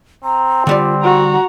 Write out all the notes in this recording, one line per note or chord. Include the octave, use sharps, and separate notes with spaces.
C4 A#5
D3 G3 F4 D5
F#4 F#5 A#5